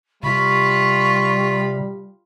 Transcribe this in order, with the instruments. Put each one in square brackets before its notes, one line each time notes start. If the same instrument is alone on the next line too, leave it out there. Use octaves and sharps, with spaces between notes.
[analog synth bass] C3 [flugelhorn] G3 [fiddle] F4 B5 [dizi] C#6